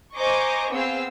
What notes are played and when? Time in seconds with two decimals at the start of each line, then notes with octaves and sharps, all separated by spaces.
0.16 C5 D#5 G#5 A#5 C#6 D6
0.71 B3 C4 G#4 F5 E6